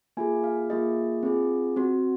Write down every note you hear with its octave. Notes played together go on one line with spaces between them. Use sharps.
A#3 F4 G#4 G#5
F5
A#3 F4 G#4 D#5
C4 F4 G#4
C4 F#4